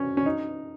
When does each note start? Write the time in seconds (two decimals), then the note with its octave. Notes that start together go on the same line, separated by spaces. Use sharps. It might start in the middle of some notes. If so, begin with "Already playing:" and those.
Already playing: C#4
0.17 C#4
0.26 D#4